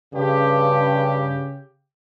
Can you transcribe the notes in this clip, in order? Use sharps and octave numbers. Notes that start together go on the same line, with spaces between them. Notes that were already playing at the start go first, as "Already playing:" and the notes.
G2 C#3 G4